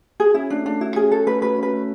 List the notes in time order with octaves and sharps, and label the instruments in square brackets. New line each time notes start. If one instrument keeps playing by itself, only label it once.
[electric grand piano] F#4 [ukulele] G#4
[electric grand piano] C#4 [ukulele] E4
[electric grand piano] A3 [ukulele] D4
[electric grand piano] A3 [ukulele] D4
[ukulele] E4 [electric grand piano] F#4
[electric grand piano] C#4 [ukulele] G#4
[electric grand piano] A3 [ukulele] A4
[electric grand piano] A3 [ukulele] B4
[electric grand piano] F#4 [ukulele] B4
[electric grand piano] C#4 [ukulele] B4
[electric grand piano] A3